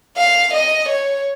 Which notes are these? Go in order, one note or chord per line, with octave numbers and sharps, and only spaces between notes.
F5
D#5
C#5